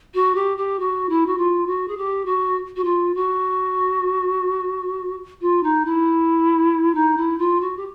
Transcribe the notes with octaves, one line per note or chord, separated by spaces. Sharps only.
F#4
G4
G4
F#4
E4
F#4
F4
F#4
G#4
G4
F#4
F#4
F4
F#4
F4
D#4
E4
D#4
E4
F4
F#4
G4